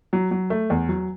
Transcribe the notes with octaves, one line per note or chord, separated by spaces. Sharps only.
F#3
F#3
A3
E2
F#3